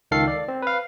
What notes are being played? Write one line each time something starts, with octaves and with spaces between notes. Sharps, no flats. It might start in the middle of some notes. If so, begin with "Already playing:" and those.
C#2 D#3 A4 F5 C7
D5
C4
B4 F5